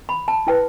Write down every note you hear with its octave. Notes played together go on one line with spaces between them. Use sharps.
B5
A5
E4 B4 G5